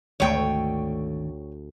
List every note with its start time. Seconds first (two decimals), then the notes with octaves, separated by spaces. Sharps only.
0.20 G#1 D2 D3 A3 C#5 G5